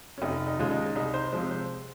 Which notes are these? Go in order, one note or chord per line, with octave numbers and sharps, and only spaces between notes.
C#4
F1 D#4
D#4
D#2 C#3 G#3 F4
D#4
C2 D#4
C5
C3 F3 G#3 C5
C5